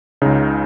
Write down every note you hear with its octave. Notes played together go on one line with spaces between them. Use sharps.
C#2 C#3 D#4